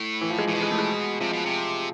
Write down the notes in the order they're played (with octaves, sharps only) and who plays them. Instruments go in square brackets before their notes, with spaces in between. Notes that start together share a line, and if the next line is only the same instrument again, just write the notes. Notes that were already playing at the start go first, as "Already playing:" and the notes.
Already playing: [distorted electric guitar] A2
[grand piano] E3
F3
G#3
[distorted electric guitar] A2 [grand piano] E3
[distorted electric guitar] B2 [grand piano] F3
[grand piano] G#3
A3
G#3
[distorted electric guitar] C3 [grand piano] F3
[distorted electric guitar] B2
C3